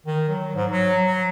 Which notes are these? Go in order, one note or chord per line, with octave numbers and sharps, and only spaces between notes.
D#3
F#3
G#2
F#3
F#3